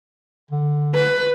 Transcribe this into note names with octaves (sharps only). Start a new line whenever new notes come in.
D3
B4